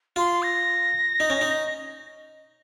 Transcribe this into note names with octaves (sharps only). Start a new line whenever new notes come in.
F4 C6
A#6
D#4
C#4
D#4